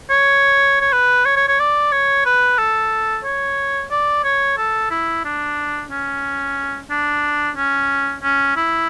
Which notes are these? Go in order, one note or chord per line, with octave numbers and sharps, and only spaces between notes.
C#5
C#5
B4
C#5
C#5
C#5
D5
C#5
B4
A4
C#5
D5
C#5
A4
E4
D4
C#4
D4
C#4
C#4
E4